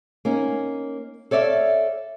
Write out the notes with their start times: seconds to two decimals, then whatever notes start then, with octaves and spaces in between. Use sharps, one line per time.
0.25 A#3 C#4 D#4
1.31 A4 C#5 D5 E5 F5